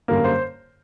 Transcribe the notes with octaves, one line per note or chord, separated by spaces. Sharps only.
F#2 D3 G3 A#3 A#4
C5